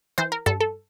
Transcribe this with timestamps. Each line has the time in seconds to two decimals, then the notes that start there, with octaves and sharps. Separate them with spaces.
0.18 E3 C5
0.32 A#4
0.46 G2 A4
0.60 A4